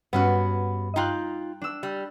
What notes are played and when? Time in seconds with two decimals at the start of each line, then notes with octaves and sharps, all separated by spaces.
0.13 G2 B3 C#4 F#4
0.96 D#4 F4 G5 F#6
1.62 D4 E6
1.83 G3